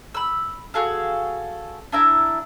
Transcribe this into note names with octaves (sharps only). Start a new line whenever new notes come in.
B5 E6
F#4 G#4 A4 F5
D4 E4 E5 A#5